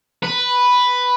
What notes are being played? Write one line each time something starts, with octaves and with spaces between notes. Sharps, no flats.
B4